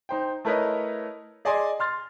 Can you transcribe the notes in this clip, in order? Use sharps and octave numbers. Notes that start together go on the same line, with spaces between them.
D#4 C5 G5
A3 E4 A#4 B4 C#5 D#5
G#4 D5 D#5 G#5 C6 D6
C6 F6 A6